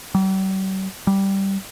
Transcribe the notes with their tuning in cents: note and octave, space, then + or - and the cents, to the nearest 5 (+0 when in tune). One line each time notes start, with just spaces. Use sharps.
G3 -45
G3 -10